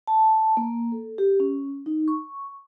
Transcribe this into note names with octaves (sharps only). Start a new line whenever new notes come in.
A5
A#3
A4
G4
C#4
D#4
C#6